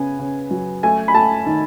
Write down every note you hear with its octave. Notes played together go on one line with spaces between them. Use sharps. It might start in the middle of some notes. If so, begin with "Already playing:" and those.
Already playing: C#3 B3 G#5
C#3
F#3
A3 G#5
B5
A3 A5
D#3